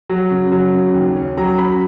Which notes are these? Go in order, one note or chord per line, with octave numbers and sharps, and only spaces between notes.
F#3
C#3
F#3
C#3
D#2
C#4
F#3 A#5
C#4 B5